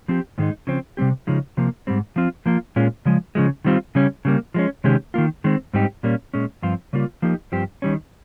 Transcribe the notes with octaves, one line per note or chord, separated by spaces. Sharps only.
F3 C4 G4
G#2 D#3 G#3 D#4
C#3 F3 C4
C3 G3 C4 G4
C#3 F3 G#3 D#4
C3 F3 A#3
G#2 G3 C4
F3 C4 F4
F3 A#3 F4
A#2 G#3 C#4 F4
C#3 F3 G#3
C#3 F3 G#3
D#3 G3 C4 F4
C#3 G3 C#4
C#3 G3 A#3
F3 G#3 C#4
C3 D#3 G#3 C#4 G4
D#3 A#3 F4
D#3 G#3 C4
G#2 G3 C4 D#4 G4
A#2 G3 A#3 C#4
A#2 G#3 C#4
G2 F3 C4 F4
C#3 G3 A#3 F4
F3 A#3 D#4 G4
G2 F3 C4 G4
D#3 G3 C#4